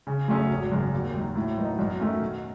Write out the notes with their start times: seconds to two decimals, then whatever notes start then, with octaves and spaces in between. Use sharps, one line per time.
0.07 C#3
0.28 F#3 A3 C#4 G#4
0.49 G#1
0.71 F#2 C#3
0.93 D#2
1.14 D#3 F#3
1.36 A2
1.58 F#3 B3 D#4
1.79 F#2
2.00 D#3 F#3 A3 C#4
2.22 B2